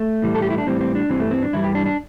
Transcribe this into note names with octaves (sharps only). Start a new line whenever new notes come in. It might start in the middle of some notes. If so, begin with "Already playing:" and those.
Already playing: A3
A2 E3 G3
A4
G4
E4
D4
A2 E3 G3 C4
C4
D4
G2 E3 G3 C4
A3
C4
D4
G2 E3 G3 E4
G4
D4
D4